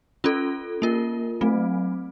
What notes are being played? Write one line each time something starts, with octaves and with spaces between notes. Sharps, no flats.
C#4 F4 A4
A#3 F4 A#4
F#3 A3 C4